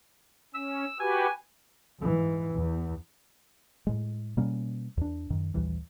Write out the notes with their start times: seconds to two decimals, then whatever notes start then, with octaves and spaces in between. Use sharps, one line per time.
0.55 C#4 E6
1.00 F#4 G4 B4 G#5
1.99 G#2 E3
2.54 E2
3.87 A2 G#3
4.37 B2 G3 A#3 C#4
4.97 E2 D4
5.30 F#2 D#3
5.54 A#1 D#2 E3 G3